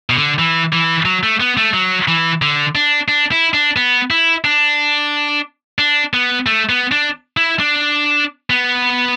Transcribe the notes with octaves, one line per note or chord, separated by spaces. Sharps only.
B2
D3
E3
E3
F#3
A3
B3
A3
F#3
E3
D3
D4
D4
E4
D4
B3
E4
D4
D4
B3
A3
B3
D4
E4
D4
B3